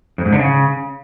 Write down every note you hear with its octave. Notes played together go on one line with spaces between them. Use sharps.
F2
G#2
D3
C#3